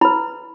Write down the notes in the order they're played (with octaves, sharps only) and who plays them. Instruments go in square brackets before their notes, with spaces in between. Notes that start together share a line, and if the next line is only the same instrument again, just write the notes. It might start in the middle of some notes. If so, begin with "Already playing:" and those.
[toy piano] E4 B4 B5